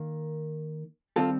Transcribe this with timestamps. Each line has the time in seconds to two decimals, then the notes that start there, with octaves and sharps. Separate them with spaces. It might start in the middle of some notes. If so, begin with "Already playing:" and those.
Already playing: D#3 A#3
1.16 D#3 G3 C4 F4 A4